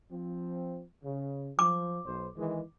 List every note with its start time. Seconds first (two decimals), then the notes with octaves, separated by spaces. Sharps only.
0.11 F3 C4
1.04 C#3
1.59 F3 D6
2.05 B1 C5
2.37 D#3 E3 G#3